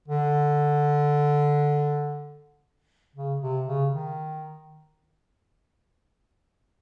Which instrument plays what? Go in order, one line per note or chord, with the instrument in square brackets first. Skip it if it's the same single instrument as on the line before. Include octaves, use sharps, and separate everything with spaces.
[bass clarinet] D3
C#3
C3
C#3
D#3